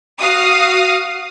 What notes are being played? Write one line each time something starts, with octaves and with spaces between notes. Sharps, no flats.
F#4 F5 D#6